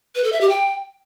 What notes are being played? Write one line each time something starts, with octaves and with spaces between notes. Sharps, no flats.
B4
A4
E5
G4
G5